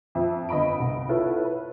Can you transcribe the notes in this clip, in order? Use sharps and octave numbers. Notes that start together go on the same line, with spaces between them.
F2 E5
G1 D#5 B5 D7
C2
E4 F4 A4 B4 C#5
B4